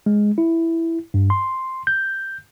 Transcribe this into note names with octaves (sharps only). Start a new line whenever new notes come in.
G#3
E4
G2
C6
G6